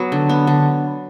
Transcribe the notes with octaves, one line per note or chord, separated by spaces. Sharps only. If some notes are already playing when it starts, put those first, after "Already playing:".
Already playing: F#3 B3 B4
D3
B3
D3